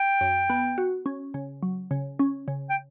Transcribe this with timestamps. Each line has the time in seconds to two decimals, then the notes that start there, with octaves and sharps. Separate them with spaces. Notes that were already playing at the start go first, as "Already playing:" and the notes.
Already playing: G5
0.21 F#2
0.50 B3
0.78 F#4
1.06 C#4
1.34 C#3
1.63 F#3
1.91 C#3
2.19 C#4
2.48 C#3
2.69 G5